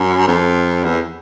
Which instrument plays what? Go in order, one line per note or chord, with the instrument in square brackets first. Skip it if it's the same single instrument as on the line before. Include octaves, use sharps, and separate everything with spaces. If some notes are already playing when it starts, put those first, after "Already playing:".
Already playing: [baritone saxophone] F#2
F2
E2